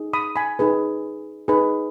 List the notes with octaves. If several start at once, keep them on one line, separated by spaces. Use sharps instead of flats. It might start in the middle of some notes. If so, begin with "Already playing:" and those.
Already playing: D#4 G#4
B5 D#6
G#5 B5
D#4 G#4 B4
D#4 G#4 B4